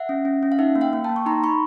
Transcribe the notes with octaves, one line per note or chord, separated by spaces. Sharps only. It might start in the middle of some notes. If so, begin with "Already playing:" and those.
Already playing: E5 F#5
C#4
C#4
C#4
F5
D#4 E5 F#5
A#3
F5 G5
A#3
A#3 G5 A5
C#6
D#4 A#5 C6
D#4 B5 C#6